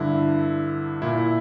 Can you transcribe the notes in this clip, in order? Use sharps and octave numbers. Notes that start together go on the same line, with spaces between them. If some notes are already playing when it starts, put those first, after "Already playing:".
Already playing: G2 D3 E4
A#2 E4
E4